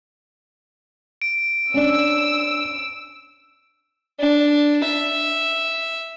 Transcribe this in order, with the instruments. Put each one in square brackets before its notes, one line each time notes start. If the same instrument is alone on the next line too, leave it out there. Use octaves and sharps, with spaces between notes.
[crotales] D7
[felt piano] C#4 D4 [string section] E6
[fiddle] D4
E5